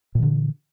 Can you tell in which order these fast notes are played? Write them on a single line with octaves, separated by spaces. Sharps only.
A#2 E3 D3